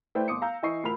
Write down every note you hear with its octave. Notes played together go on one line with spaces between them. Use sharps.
A3 E4 B4 C5 D5 G5
G1 C6 D6 D#6 C#7
F5 A#5 E6 G6
E3 E4 D#5 C#6 C7
D2 A2 F4 A#4 B5 F7